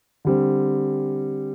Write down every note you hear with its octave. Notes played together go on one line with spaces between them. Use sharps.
D3 G3 C4